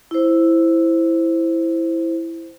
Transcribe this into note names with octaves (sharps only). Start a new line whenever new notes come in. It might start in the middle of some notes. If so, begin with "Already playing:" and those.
E4 C5